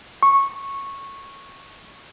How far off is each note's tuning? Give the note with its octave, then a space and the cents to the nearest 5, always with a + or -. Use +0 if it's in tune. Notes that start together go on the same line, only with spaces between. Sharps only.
C#6 -10